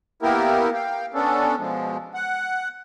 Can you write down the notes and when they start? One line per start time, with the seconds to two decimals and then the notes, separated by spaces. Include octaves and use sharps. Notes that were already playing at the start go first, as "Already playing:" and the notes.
0.22 A#3 B3 E4 G4 A#4
0.74 F5 G5
1.14 B3 C#4 D4 A4
1.58 B2 F3 G#3
2.14 F#5